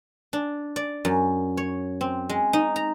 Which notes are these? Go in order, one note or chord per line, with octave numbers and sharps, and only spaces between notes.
D4
D5
F#2
C#5
C4
G#3
D#4
A#5